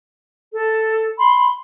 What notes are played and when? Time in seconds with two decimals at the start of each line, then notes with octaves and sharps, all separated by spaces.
0.53 A4
1.18 B5 C6